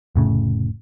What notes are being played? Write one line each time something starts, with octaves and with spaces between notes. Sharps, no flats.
F1 A2 C#3